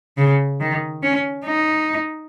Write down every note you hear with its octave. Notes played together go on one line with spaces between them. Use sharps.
C#3
D#3
C#4
D#4